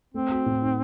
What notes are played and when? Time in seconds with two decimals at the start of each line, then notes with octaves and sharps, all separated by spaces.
0.14 A3 C4
0.31 F#4
0.46 A2
0.62 D#4